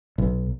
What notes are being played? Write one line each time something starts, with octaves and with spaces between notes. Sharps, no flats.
B1